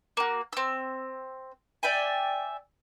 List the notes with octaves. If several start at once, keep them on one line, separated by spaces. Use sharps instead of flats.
A#3 F#4
C4 E6
D5 E5 G5 G#5